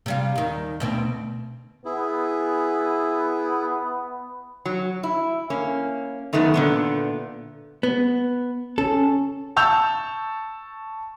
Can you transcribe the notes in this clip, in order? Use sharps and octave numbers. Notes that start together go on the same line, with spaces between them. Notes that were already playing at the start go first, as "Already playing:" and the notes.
C3 G3 F4
D#2 D#3
D2 B2 C4
B3 E4 G#4
F#3
E4
A#3 C#4
F#2 D#3 A3 B3
A#2 D3 B3
B3
C#4 A4
A5 C#6 E6 G6 F7